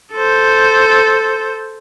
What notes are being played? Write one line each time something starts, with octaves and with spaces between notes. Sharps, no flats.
A4 C5